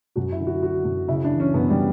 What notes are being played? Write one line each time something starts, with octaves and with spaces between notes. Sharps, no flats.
F#2 F#4
E4
D3
F#4
D3 F#4
F#2
C#3 E4
D4
E3
C#4
F#2 B3
G3